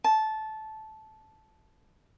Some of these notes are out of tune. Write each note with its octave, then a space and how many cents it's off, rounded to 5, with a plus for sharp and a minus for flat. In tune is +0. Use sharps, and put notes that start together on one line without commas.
A5 -15